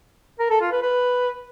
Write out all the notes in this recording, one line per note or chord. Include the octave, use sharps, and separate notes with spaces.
A#4
A4
F4
B4
B4